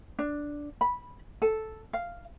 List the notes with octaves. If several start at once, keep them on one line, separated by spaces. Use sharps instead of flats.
D4
B5
A4
F5